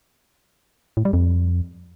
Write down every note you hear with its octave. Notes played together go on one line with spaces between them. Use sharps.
A2
G3
F2